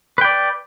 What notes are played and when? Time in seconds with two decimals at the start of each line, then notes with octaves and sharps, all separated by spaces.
0.18 B4
0.21 G5
0.25 D5